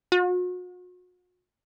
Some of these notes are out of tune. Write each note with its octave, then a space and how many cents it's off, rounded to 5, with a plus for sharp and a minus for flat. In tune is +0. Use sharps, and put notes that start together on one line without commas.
F#4 -40